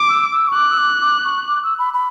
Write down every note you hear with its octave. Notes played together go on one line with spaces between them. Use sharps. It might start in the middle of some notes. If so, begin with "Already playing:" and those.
Already playing: D6
E6
E6
C#6
D6 F#6
E6
D6
D6
C#6
D6
E6
B5
B5